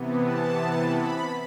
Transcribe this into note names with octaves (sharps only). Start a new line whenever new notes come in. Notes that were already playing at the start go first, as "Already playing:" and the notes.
Already playing: C3 E3 B3
A5
B5